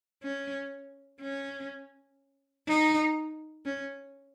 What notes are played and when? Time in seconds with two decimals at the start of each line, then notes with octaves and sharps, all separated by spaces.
0.23 C#4
1.21 C#4
2.68 D#4
3.65 C#4